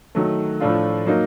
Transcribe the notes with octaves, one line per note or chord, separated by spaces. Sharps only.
D#3 F#3 A3
A2 F3 A3 D4 F4
F#3 A#3 D#4